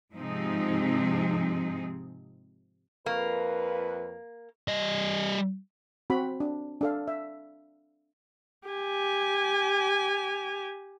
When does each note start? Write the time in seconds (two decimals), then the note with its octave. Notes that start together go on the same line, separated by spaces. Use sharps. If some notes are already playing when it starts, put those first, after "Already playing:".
0.15 G#2 C3 F3 C4 D#4 G#4
3.06 F2 A#3 B4
4.68 G3 D#5
6.10 C4 F#4 B5
6.40 D4
6.81 D4 A4 F5
7.08 E5
8.68 G4 G#5